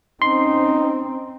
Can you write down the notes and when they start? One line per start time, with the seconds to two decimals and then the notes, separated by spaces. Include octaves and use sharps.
0.22 C4 C#4 D#4 C6